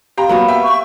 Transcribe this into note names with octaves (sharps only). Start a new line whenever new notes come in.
G4 F5 G5 A#5 C6
F#3 A#3 B3 F#4
E5 G5
C#6